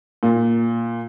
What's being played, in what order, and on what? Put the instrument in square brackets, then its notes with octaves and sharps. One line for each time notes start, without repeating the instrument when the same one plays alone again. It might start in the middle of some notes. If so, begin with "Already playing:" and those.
[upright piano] A#2